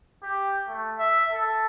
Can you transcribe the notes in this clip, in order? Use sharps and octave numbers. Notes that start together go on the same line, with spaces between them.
G4
A3
E5
A4